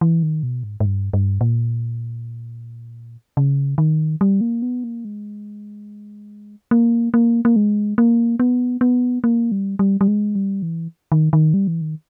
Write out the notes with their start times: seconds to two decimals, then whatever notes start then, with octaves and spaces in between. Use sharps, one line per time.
0.01 E3
0.23 D#3
0.43 B2
0.63 G#2
0.80 G#2
0.86 G2
1.14 G2
1.41 A#2
3.37 C#3
3.78 D#3
4.21 G3
4.41 A#3
4.62 B3
4.84 A#3
5.05 G#3
6.71 A#3
7.14 A#3
7.45 A#3
7.56 G#3
7.98 A#3
8.40 B3
8.81 B3
9.24 A#3
9.52 G3
9.79 G3
10.01 G3
10.08 G#3
10.35 G3
10.62 E3
11.12 D#3
11.33 D#3
11.54 G3
11.67 E3
11.81 D#3